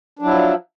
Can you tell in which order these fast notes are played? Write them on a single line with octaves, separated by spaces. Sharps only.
D4 F#3 E4 F3